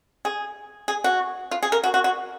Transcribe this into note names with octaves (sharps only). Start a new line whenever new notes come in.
G#4
G#4
F#4
F4
G#4
A#4
F#4
F#4
F#4